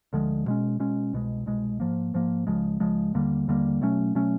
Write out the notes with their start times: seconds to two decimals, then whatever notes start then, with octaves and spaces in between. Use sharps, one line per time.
0.13 D2 D3 F3 G#3
0.46 B2 G#3 C#4
0.80 B2 G#3 C#4
1.13 C2 B2 G#3
1.46 C2 B2 G#3
1.80 G#2 F3 A#3
2.14 G#2 F3 A#3
2.47 C#2 C#3 F3 G#3
2.80 C#2 C#3 F3 G#3
3.14 D#2 D3 G3 A#3
3.48 D#2 D3 G3 A#3
3.81 B2 F#3 A3 C#4
4.15 B2 F#3 A3 C#4